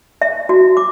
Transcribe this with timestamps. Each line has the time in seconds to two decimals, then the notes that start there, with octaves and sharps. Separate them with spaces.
0.22 E5
0.49 F#4
0.77 D6